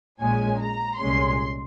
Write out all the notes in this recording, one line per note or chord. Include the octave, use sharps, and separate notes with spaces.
A#1 A#2 G#3 C#4 G#5
A#5
C2 A#2 G#3 C#4 C6